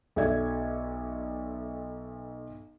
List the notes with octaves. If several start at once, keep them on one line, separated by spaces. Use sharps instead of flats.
B1 F#3 A4 D5 E5 G#6